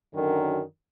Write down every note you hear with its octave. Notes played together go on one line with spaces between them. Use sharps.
F#2 D3 D#3 F#3